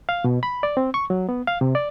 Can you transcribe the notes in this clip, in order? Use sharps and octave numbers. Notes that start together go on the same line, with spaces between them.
F5
B2
B5
D5
C4
C#6
F#3
B3
F5
C3
D5